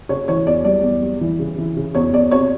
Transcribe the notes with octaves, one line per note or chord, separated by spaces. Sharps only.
C#3 C#5
E3 C#5
E2 D5
G3 D5
E2
G3
E3
C#3
E3
C#3
E2 C#5
E2 D5
C3 C#5